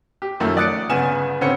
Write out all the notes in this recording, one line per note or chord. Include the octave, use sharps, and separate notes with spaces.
G4
F#2 D#3 F3 A3 A#3
D5 D#6 F#6 A6 C#7 D7
G1 C#3 B3 F#5 G#5 E7
A1 D3 C4 C#4 B4 C#7